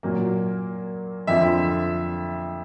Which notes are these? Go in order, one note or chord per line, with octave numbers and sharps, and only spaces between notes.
A#2 F#3 A#3
F2 D3 F3 E5